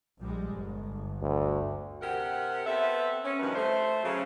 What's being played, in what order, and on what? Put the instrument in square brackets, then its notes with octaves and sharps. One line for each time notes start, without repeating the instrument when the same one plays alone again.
[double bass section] A#1 G3 G#3
G1
[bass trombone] D2
[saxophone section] C3 G4 A#4 F#5
B3 C4 A4 E5
C#4
G2 C3 D#3 F3 F#4 B4
A3 C5
C#3 F#3